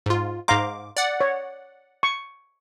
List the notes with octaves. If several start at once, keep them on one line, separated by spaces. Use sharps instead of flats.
G#2 F4
G#2 F5 A#5 C6 D6
D5 F#5
C#5
C#6